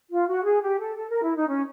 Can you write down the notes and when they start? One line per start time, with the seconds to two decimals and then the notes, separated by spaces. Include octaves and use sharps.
0.11 F4
0.28 F#4
0.45 G#4
0.62 G4
0.79 A4
0.96 A4
1.10 A#4
1.23 E4
1.35 D#4
1.48 C#4